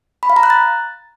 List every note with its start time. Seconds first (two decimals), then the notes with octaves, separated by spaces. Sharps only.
0.23 B5
0.30 F5
0.36 A#5
0.43 F#6
0.50 A6